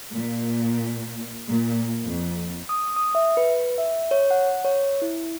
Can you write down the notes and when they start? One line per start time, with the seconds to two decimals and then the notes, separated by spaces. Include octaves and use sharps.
0.12 A#2
1.48 A#2
2.03 F2
2.69 D#6
2.96 D#6
3.15 E5
3.37 B4
3.78 E5
4.11 C#5
4.31 F#5
4.64 C#5
5.02 E4